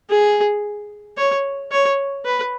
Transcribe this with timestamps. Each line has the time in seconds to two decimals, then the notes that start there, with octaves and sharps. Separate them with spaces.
0.10 G#4
1.17 C#5
1.72 C#5
2.25 B4